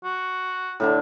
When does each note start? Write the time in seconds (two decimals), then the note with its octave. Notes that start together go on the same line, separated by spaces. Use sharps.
0.04 F#4
0.80 A2 D3 D4